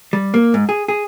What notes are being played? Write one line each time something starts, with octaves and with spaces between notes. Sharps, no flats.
G3
A#3
G#2
G#4
G#4